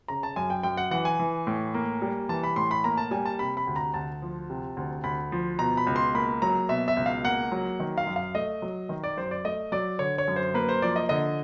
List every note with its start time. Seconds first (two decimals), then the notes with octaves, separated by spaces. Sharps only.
0.08 C#3 A#5
0.23 A5
0.36 F#2 G#5
0.50 G5
0.63 F#2 G5
0.77 F#5
0.91 E3 F#5
1.05 G#5
1.19 E3
1.47 A2
1.74 A#3
2.02 G3
2.29 E3 A5
2.44 B5
2.56 A2 C6
2.71 B5
2.84 A#3 A#5
2.97 A5
3.11 G3 G#5
3.25 A5
3.39 C3 B5
3.57 B5
3.67 D2
3.76 A#5
3.94 D2 A5
4.22 F3
4.50 C3
4.77 D2
5.04 D2 B5
5.32 F3
5.59 B2 A#5
5.77 B5
5.87 C#2
5.96 C6
6.14 A#3 B5
6.42 F#3 A#5
6.69 B2 E5
6.88 E5
6.97 C#2
7.06 F5
7.24 A#3 F#5
7.52 F#3
7.80 D#3
7.98 F5
8.06 F#2
8.16 F5
8.35 A3 D#5
8.62 F#3
8.89 D#3
9.04 D5
9.17 F#2 C5
9.31 D5
9.44 A3 D#5
9.72 F#3 D5
9.99 D3 C#5
10.18 C#5
10.28 F#2
10.36 C5
10.54 A#3 B4
10.69 C5
10.82 F3 D5
10.96 D#5
11.09 D3 D#5